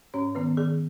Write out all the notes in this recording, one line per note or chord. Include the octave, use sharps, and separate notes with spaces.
G#2 C#4 C#5
D#3 B3 B4
D#3 G#4